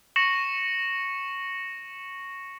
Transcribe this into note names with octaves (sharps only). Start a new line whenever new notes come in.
C#6 A#6 C#7 E7 F#7